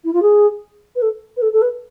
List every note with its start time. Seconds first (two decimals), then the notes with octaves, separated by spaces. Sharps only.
0.04 E4
0.13 F4
0.22 G#4
0.96 B4
1.02 A4
1.37 B4
1.42 A4
1.53 A4
1.62 B4